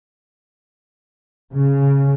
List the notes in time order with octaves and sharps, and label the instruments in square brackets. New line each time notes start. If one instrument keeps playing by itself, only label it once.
[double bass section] C#3